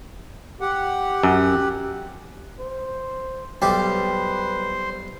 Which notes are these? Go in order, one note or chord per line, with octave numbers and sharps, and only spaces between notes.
G4 F#5
F#2
C5
B1 G3 G4 B4 C5